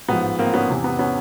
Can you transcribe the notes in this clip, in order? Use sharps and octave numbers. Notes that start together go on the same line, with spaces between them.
A1 G#2 F3 B3
A#3 C4
B3 C#4
E2 C3 E3
B3
B3 C#4